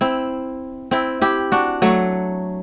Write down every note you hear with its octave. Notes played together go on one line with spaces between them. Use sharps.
C4 E4
C4 E4
E4 G4
D4 F#4
F#3 A3